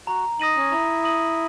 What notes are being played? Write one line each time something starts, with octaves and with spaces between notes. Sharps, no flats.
F#4 A#5
D#4 D#6 A#6 D#7 F#7
C#4
E4 A#5
D#6 A#6 D#7 F#7